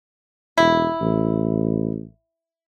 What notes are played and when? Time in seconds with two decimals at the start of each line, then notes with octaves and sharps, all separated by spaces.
0.58 E1 E4
1.01 A1